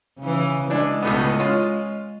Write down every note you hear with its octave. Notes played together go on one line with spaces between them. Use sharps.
C#3 E3
E3 G#3 D4
C#2 A2 B3
C#4 F4